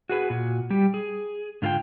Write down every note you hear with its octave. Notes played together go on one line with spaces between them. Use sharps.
F#4 G#4 B4
A#2 F#4
G3 G4
G#4
G#2 D3 F4 A4 F5 G5